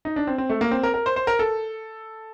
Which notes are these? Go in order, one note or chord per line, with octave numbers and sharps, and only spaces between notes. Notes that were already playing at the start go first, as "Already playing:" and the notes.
D#4
D4
C4
C4
A3
A#3
C4
A#4
A#4
C5
C5
A#4
A4